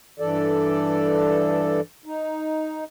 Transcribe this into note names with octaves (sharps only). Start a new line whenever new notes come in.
G2 E3 A4 D5
D#4